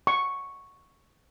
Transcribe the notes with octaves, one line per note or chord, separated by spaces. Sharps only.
C#6